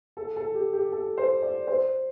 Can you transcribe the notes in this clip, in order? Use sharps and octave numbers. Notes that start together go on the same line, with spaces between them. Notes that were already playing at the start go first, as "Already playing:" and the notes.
A4
A4
G4
G4
A4
C5
D5
C5